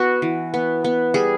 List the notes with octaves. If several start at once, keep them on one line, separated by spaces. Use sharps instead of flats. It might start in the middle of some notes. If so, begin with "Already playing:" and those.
Already playing: B3 F#4
E3
B3
B3
G3 G#4